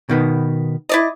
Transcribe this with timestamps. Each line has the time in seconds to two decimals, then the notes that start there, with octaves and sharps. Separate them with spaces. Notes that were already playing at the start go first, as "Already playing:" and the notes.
0.09 B2 D#3 B3
0.89 E4 D5 D#5